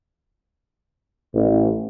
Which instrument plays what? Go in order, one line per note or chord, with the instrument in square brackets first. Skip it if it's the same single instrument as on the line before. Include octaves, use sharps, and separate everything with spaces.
[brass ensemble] A1